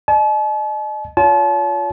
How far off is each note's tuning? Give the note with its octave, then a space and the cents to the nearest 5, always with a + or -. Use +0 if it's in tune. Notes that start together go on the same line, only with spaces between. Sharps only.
D#5 -35 A5 -45
F4 +0 C#5 +35 A5 -35